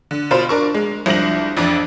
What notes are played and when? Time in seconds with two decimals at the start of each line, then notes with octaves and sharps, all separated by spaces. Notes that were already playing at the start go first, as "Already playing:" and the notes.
0.11 D3
0.31 B2 F4 C5 B5
0.49 D4 A#4 C#6
0.74 G#3
1.06 C2 F3 D4 A#6 F#7
1.57 A1 F2 D4